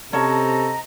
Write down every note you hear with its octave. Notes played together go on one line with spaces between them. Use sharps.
C3 C#4 A4 C5 D#5 A5 A#5